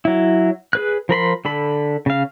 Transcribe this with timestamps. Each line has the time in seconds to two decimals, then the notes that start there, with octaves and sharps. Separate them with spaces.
0.05 F#3 E4
0.73 G#4 B4 F#6
1.09 F3 A#4 B5 C6
1.45 D3 A4 B5
2.06 C#3 F5